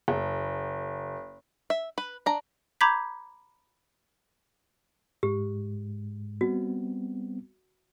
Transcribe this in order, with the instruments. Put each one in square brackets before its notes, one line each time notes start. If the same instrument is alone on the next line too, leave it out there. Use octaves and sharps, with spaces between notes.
[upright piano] F#1
[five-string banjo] E5
B4
D4 A#5
[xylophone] A#5 B5 D6 G6 G#6 B6
[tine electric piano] G#2 G#3 [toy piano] G4
[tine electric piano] G3 B3 C4 [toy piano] F#4